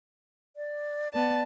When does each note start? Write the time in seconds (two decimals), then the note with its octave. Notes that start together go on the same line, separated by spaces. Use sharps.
0.56 D5
1.13 B3 D5 A5